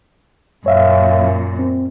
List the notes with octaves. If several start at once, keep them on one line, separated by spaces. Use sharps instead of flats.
F#2 A#2 C#5 E5 F5
C4